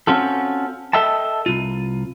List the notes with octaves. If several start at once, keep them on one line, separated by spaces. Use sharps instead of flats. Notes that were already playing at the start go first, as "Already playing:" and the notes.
C4 C#4 F4 F#4 A4
A4 D#5 E5 G5 A5
C2 F4